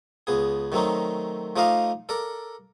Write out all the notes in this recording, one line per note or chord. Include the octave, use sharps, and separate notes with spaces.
C#2 B3 G#4
D#3 F#3 A3 C4 D#4
F3 A3 D#4 D5 D#5 F5
A4 A#4 D5